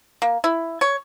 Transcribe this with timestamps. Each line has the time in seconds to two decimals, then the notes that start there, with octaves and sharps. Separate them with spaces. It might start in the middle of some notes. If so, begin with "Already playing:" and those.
0.22 A#3
0.44 E4
0.81 C#5